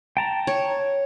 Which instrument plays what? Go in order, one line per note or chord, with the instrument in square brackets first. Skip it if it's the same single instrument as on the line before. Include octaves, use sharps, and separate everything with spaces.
[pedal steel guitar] G5 A5 A#5
[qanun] C#5